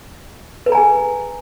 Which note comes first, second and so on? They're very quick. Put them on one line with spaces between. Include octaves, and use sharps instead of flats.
B4 A4 A#5 G#5 G#4